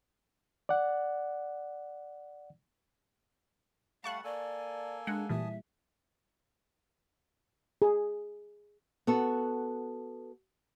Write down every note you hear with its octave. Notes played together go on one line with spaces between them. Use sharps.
D5 F#5
G3 A3 F5 F#5 A5 C#6 F#6
A#3 A4 D5 G#5
G#3 D4 F#5
A#2 E3 G3 E5 G#5 A5 D#6
G#4
B3 F#4 A4